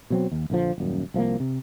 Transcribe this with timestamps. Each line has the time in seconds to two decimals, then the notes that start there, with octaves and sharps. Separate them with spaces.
0.10 B2 F#3 C4
0.31 D#2
0.50 A#1 D3 F3
0.78 D#1 F#2
1.14 C2 F3 A3 A#3
1.40 C3